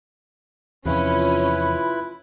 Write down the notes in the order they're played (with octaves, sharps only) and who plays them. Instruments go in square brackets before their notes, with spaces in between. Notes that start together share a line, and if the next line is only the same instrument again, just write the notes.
[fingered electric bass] E2 C3 F3 [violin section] C#4 [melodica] E4 B4 [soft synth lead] F4